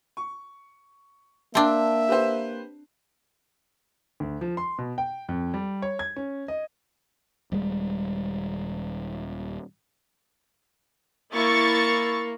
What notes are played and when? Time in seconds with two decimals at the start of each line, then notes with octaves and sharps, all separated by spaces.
0.17 C#6
1.55 A#3 C4 D4 E5 G5 A5
2.08 G4 B4 C5
4.20 D2
4.41 F3
4.57 C6
4.78 B2
4.98 G5
5.29 F2
5.54 G3
5.82 C#5
5.99 G#6
6.16 C#4
6.48 D#5
7.52 D#1 G3 G#3
11.34 A#3 E4 C#6 A6